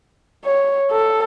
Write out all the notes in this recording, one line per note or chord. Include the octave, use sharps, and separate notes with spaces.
C#5
A4